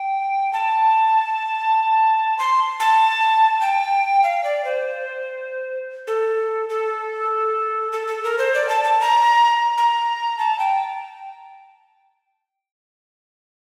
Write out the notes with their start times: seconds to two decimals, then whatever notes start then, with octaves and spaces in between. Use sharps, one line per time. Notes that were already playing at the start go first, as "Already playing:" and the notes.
Already playing: G5
0.53 A5
2.39 C6
2.80 A5
3.61 G5
4.23 F5
4.44 D5
4.65 C5
6.07 A4
6.69 A4
7.92 A4
8.07 A4
8.23 A#4
8.39 C5
8.54 D5
8.69 A5
8.84 A5
9.01 A#5
9.78 A#5
10.39 A5
10.59 G5